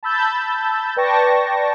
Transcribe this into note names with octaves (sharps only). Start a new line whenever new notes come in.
A5 B5 E6 G6 A6
B4 D5 G5 A5 C#6 A#6